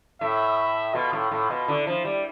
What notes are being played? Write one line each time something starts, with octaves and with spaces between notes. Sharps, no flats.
A2 E5
B2 F4
A2
A2
B2
D3 E4
F3
G3